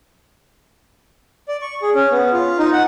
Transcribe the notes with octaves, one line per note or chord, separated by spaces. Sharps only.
D5
C#6
G#4
C#4
B3
F4
D#4
F#5